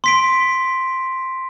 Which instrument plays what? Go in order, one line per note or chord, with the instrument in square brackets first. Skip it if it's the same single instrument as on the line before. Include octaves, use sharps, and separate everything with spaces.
[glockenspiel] C6 B6 D7